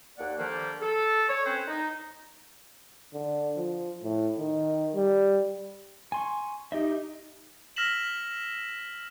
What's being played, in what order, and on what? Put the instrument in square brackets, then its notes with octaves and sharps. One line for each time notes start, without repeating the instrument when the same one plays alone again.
[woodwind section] D#2 A#3 D5 F#5
D3 D#3 F3 G3 A#3
A4
C#5
C4 C#4 A4 B4 C5
D#4
[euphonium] D3
F3
A2
D#3
G3
[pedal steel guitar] G#5 C6 C#6
[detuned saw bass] D#4 [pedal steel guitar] G4 D#5 E5
[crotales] E6 F6 A#6 B6 E7 F#7